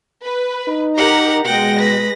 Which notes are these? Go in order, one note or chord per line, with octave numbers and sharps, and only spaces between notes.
B4
D#4
G4 A#4 F#5 A#5
B2 G#3 F#5 G5 A#6
B4